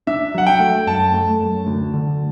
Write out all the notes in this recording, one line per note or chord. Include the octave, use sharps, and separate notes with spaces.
D4 E5
F#3 F#5
G5
A3
F#2 A5
A3
F#2
D2
D3